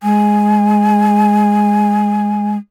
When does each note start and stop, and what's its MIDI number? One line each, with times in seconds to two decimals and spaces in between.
0.03 2.57 56
0.03 2.52 80